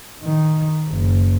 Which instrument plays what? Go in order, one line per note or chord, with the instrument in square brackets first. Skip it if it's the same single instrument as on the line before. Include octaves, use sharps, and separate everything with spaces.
[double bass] D#3
F#1